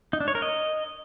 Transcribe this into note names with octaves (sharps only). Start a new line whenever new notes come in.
D#4
D4
C#5
A#4
D#5